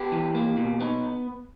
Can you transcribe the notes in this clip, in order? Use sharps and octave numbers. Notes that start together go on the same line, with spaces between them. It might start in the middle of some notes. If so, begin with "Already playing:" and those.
Already playing: B3 G4
E3
A#3
B2
B3 D#4